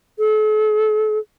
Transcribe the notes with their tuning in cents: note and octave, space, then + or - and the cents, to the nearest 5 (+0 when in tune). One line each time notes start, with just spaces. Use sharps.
A4 -40